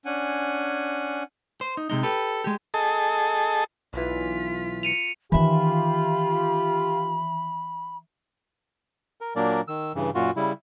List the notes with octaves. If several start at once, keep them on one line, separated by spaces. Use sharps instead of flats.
C#4 D4 F#5 G#5
C5
D#4
C3 G#3 D#4
G4 A4 B4
G#3 G4
G#4 A4 D#5 A5
B1 E3 F4 B6
C#7 D#7 F7
D#3 E3 D#4 F4 G4 E5 B5
A#4
A#2 F#3 A#3 D4 A#4 D5
D#3 E6
G2 C#3 E3
F#2 A#2 F4 F#4
C#3 G3 E4